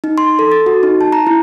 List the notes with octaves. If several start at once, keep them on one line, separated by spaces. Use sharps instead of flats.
D#4
C6
A4
A6
F#4
D#4
A5
A#5
E4